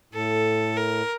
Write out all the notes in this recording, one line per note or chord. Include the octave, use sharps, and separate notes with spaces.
A2 A4
A#4